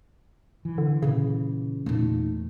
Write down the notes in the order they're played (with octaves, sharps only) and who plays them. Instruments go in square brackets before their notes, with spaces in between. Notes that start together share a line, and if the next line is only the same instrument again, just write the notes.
[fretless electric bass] E3
[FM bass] D3
[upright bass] A#2 A#3 [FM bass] C#3
[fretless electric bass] E2 A3 [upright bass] A#2 D#4